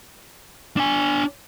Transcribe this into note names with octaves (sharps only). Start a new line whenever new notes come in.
D4 G#5